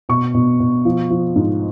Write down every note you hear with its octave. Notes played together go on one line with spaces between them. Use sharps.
B2 C#6
B2
B2
F3
F3
G#2